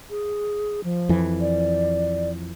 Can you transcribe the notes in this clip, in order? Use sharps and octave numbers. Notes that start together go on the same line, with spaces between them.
G#4
F3
F2 E3
D5